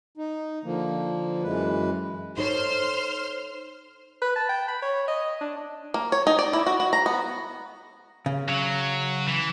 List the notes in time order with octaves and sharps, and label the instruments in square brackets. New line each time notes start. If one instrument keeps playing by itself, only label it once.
[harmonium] D#4
D3 F3 A#3
F#2 E3 G#3 B4
[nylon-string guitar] D#4 A4 C#5 [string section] C5 C6 F6
[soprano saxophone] B4
A5
G5
B5
C#5
D#5
D4
[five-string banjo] A#3
C#5
D#4
D5
E4
F#4
F#4
A#5
B3
[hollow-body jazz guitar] C#3
[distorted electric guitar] F#3
E3